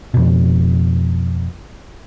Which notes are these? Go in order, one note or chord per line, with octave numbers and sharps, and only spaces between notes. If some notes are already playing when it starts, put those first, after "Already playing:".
F2 B2